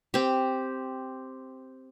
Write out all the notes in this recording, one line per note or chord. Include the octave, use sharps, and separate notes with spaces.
C4 G4